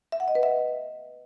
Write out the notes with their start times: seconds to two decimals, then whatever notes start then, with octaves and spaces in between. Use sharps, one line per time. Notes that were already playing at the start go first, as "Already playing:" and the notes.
0.12 E5
0.20 F#5
0.28 D#5
0.35 B4
0.43 E5